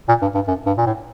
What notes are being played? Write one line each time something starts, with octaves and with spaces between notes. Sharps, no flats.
A#2
G2
G2
F#2
G2
A#2
A2